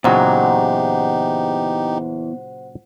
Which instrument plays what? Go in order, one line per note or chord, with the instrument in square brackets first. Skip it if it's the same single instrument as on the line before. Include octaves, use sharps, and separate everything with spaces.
[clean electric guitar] E2 [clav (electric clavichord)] A#2 C#3 F#3 [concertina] D#4 G4 [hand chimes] C5 F#5